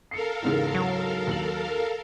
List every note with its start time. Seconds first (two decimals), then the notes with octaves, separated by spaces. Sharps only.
0.11 A4 A#4 F5 C7 C#7
0.42 E2 G#2 C#3
0.75 F#3
1.27 D#2 F#7